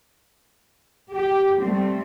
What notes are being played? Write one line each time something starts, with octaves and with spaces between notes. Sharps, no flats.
G4
G3 A3 C4